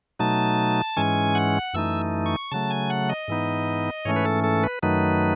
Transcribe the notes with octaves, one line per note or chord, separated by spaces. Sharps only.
B2 F#3 A3 D#4 A5
G#2 E3 G#3 C#4 G#5
F#5
F#2 E3 A3 D#4 E6
C#6
C#3 F#3 A3 A5
G#5
F#5
D#5
G#2 E3 B3 D#4
G#2 E3 A3 C#4 C#5
B4
A4
A4
B4
F#2 D#3 F#3 A3 D#4 B4